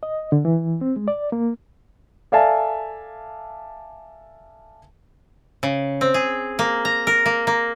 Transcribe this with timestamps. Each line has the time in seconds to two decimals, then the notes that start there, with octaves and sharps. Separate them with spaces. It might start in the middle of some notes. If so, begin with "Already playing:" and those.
0.03 D#5
0.32 D3
0.45 E3
0.81 C4
0.96 G#3
1.08 D5
1.32 A#3
2.32 A4 D5 E5 F5 G#5 A5
5.63 C#3
6.01 C4
6.14 G#4
6.59 A#3
6.85 A#5
7.07 A#4
7.26 A#3
7.47 A#3